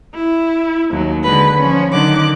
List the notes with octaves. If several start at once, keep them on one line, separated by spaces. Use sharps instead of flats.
E4
D#2 F#3
D3 G#3 B4
F3 C#4
D3 D#3 F#3 D6 F#6